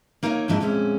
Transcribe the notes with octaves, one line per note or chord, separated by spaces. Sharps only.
A#3 D#4 A#4 C#5 E5
G#2 F3 D4 E4 D#5
F2 A#2 G#3 C#4 E4 E5